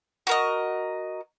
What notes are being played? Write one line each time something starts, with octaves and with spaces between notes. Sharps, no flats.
F#4 A#4 D#5